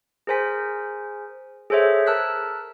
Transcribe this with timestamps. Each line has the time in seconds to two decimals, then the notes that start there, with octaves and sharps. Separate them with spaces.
0.27 G#4 A#4 C5 G#5 B6
1.70 G#4 A4 C5 C#5 E5
2.06 A#4 A5 E6 F#6 B6